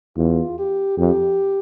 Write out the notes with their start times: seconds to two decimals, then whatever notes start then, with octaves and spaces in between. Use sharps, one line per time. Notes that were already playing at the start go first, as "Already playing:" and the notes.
0.17 E2 F4
0.58 G4
0.98 F2 G4